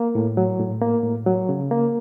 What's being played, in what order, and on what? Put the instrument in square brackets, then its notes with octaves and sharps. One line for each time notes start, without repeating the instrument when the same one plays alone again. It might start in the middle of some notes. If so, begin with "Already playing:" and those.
Already playing: [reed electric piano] A#3
A2
F#3
A2
A#3
A2
F#3
C#3
A#3